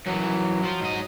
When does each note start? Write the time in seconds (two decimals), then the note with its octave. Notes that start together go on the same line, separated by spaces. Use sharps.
0.06 F#2 E3 F#3
0.64 F3 F4
0.81 G#2 D#5